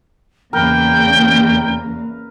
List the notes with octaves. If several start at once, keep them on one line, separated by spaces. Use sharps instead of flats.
E2 C#3 A#3 A#4 B4 G5